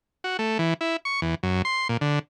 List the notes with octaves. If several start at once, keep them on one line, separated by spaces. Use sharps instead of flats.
F#4
A3
E3
E4
C#6
E2
F#2
C6
A#2
D3